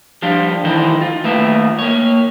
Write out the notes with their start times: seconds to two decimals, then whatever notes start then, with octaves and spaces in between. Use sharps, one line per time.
0.22 F3 G3 D4 F4
0.64 D#3 E3 D#4 E4 A4 C5
1.01 F4
1.24 D#2 A3 F4 B4 E5
1.79 A#3 C#5